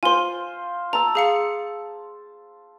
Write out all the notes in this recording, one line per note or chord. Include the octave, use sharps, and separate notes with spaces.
F4 C5 G#5 C6
A5 A#5 E6
G#4 F5 C#7